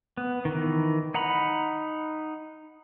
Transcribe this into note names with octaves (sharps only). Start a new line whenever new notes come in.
B3
D#3 E3
D#4 F#5 A#5 B5